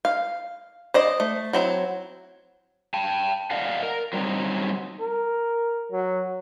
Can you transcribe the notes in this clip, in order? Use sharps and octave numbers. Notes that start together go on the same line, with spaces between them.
F5
C5 D5 D#5
A3
F#3 C4 E4
G5 A5
D5 D#5 F5 F#5
A#4
F#3 G3 B3 C4 D#4
A#4
F#3